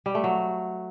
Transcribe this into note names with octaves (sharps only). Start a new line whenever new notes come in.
G3
A3
F#3